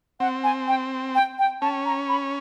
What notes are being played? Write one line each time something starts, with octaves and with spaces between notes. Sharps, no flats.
C4 F#5
G#5
G5
G5
G5
C#4 A5
A#5
B5